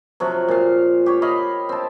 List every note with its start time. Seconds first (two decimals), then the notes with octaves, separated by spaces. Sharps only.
0.20 C3 F3 F#3
0.48 A#2 F5
1.06 G4 C#5
1.22 C#5 D#5 F5 B5
1.69 C4 A5